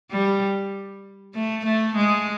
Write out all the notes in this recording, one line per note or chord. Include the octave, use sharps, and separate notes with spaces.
G3
A3
A3
G#3